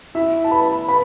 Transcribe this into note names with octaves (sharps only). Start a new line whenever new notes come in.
E4 E5
A5
B4 B5
B4 B5